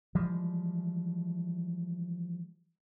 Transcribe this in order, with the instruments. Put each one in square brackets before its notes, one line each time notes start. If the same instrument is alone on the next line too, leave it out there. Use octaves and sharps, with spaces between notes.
[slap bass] E3 F3 G3 G#3